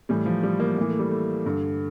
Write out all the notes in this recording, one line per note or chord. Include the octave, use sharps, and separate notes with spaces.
A2 E3 G3
F3
G3
A#3
A2 E3 A#3
A3
G3
A3
G2 D3